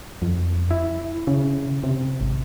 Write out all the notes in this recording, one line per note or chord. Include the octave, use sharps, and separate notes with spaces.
F2
E4
C#3
C3
G#1